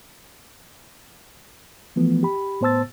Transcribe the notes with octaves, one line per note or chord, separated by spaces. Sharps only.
E3 F3 A3 B3
G4 B5
A2 B3 C5 A5 E6 A6